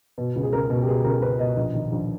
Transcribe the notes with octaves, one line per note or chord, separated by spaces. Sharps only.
B2
C#2
G#4
C#2 A#4
B2
G4
B2 G#4
C#2 A#4
C#2 B4
B2 D#5
A#1
D#3
A#1